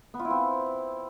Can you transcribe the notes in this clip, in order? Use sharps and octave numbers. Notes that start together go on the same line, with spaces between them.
B3
F4
E4
C4